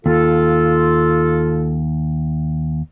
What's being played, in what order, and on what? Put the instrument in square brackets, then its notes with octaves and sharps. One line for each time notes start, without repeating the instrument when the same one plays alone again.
[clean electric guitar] D#2 [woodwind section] F4 A4